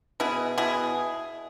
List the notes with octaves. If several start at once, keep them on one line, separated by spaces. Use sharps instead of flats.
B2 E4 G#4
B2 E4 G#4